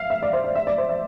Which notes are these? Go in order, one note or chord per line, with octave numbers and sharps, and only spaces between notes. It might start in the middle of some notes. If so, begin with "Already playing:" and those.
Already playing: E5 F5
E5
D5
C5
D5
E5
D5
C5
E5